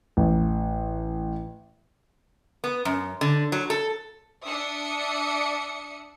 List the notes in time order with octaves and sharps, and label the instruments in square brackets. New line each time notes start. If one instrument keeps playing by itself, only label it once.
[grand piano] A1
[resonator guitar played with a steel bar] B3
F#2
D3
F#3
A4
[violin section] D4 E5 D#6 C#7